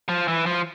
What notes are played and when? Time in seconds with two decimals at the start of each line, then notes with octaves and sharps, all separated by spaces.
0.09 F3
0.28 E3
0.46 F3